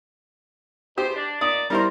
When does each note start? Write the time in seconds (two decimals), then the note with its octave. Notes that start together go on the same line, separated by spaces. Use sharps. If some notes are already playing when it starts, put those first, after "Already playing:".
0.98 E2 G4 C5
1.16 D4
1.41 A#2 D5 D#6
1.70 G3 E4 A#4 C5